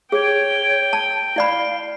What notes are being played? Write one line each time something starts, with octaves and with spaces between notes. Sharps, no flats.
G#4 C#5 G5
A5
E4 D5 F5 B5